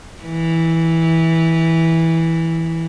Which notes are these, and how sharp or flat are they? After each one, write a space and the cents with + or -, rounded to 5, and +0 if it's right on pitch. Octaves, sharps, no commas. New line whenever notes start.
E3 -10